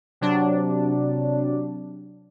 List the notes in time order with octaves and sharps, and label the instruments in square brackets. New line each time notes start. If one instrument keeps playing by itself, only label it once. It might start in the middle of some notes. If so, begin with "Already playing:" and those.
[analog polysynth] C3 F#3 D4